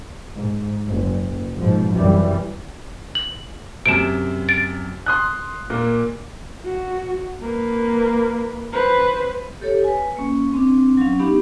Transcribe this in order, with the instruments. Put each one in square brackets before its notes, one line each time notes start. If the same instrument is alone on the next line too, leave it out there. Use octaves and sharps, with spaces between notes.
[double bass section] G#2
F#1
G#2 B2 F3
F#2 C3 E3 G3
[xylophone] F#7
[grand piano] F#2 C3 [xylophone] D7 E7
[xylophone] A6 D7
[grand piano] C6 D#6 F#6
A#2 A#3
[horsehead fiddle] F#4
A#3 B4
B4 C5
[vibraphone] G4 A4 C#5
B4 G#5
A#3 C#4
C4 D4
F#3 C#4 F5
B3 D4 D#4 G4